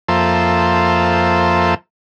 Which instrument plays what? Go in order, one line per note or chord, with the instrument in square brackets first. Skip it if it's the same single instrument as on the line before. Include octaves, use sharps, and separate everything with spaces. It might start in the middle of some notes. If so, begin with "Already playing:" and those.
[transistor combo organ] F2 F3 A#3 A4 C5 E5